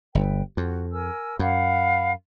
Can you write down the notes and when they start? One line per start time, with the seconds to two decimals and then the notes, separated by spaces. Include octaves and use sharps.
0.15 G1 B4 G5
0.57 F2 F#4
0.92 A#4 G#5 E6
1.39 F#2 F5 F#5 B5